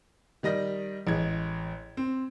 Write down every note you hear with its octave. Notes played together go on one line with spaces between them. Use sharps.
D#3 G3 D#5 A#6
A1 G#3 G#6
C4